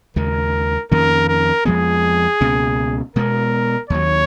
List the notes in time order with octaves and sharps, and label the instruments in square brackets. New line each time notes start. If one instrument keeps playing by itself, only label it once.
[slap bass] D#2 C#3 G#3 [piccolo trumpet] A#4
[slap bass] F2 D#3 A#3 C#4 [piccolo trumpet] A#4
[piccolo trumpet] A#4
[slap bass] F2 F3 G#3 B3 [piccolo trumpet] G#4
[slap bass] C#2 B2 A#3 C#4
[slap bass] B2 G#3 B3 [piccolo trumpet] A#4
[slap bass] D#2 D#3 F#3 [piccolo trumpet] C#5